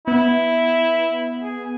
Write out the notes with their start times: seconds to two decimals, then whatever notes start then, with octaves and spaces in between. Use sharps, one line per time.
0.07 B3 E4
1.43 G#4